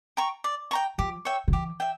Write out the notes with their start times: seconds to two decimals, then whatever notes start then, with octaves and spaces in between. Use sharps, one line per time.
0.17 G5 A#5 C#6
0.44 D5
0.71 G5 A#5 C#6
0.98 F3 G4
1.25 C#5 E5 G5
1.48 D3
1.52 E3 G4
1.80 E5 G5